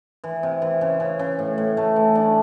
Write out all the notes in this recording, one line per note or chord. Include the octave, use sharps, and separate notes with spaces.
E3
C3
E3
C#3
C#3
C#3
A2
A2
A3
E3
D4